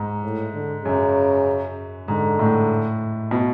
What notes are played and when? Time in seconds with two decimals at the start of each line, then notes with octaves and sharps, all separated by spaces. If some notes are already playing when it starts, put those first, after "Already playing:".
Already playing: G#2
0.23 A2
0.54 D3
0.84 F#2 C#3
2.08 G#2 D3
2.39 A2
3.31 B2